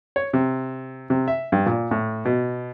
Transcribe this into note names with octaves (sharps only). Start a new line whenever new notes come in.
C#5
C3
C3
E5
G2
A#2
A2
B2